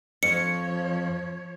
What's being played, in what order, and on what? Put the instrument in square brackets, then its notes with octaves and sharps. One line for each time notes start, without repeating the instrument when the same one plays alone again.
[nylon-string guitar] F2 [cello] F3 C#5 [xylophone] C#7